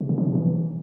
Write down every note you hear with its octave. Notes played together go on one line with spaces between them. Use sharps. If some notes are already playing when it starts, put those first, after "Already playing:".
C3
D3
F3
B2
E3